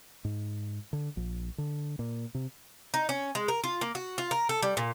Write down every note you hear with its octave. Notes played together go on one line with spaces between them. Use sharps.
G#2
D3
A#1
D3
A#2
C3
D#4
C#4
G#3
A#4
F4
A#3
F#4
F4
A#4
A4
G3
A#2